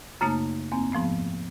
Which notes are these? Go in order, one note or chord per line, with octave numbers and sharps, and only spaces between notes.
F#2 C#3 A3 A#3 D#4
E2 A#3 C4
G#2 F3 A3 B3